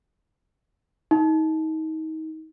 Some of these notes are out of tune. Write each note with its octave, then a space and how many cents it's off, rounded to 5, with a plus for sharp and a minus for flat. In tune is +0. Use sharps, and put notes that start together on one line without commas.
D#4 +30